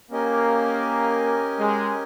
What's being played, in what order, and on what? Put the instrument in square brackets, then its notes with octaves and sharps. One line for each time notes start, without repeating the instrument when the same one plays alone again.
[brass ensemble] A#3 [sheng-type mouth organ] C#4 G4 A#4 D#5 G#5
[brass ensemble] G#3